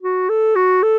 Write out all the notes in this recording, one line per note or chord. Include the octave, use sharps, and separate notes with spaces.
F#4
A4
F#4
A4